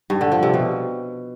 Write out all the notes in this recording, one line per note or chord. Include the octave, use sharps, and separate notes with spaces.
G2
D3
F3
C3
B2